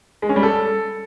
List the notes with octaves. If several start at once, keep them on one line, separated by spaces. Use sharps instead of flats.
G#3
C#4
G3
A4